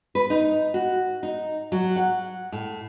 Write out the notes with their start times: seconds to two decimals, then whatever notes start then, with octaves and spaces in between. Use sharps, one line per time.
0.15 B4
0.30 D#4
0.74 F#4
1.23 D#4
1.72 F#3
1.96 F#5
2.52 A2